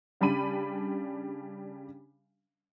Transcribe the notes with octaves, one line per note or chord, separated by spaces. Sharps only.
C#3 G3 D4 B5 D#7